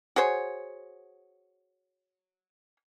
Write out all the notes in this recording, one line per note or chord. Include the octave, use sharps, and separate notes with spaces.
F#4 G#4 C5 C#5